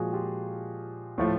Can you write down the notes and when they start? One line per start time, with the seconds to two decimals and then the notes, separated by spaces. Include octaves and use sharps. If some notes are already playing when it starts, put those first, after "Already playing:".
Already playing: A#2 F3 G#3 F#4 G#4
0.13 F4 G4
1.18 A2 F3 A3